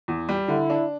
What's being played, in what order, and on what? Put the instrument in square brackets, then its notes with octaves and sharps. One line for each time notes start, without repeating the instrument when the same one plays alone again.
[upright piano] E2
G3
[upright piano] D3 [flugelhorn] E4
[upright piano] D4